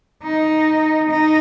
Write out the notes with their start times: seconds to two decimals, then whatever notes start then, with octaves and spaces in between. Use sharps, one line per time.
0.23 D#4
1.10 D#4